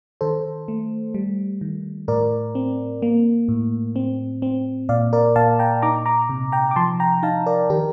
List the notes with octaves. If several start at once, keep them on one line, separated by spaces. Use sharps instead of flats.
D#3 A4 C5
A3
G3
D#3
A2 A#4 D5
C4
A#3
A2
C4
C4
A#2 D5 F5
A#4 D5
A#2 F5 A5
G5 A#5
D#4 A#5 D6
A#5 D6
C3
G5 A#5
D6
F3 A5 C6
G5 A#5
D#4 F5 A5
A#4 D5
D#3 G4 A#4